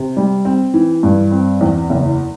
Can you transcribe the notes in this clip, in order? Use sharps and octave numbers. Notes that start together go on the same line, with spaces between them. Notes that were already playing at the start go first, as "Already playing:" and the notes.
Already playing: C3
G3
C4
E3
G2
C4
E2
F#1